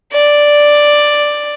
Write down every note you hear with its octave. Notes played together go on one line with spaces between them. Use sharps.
D5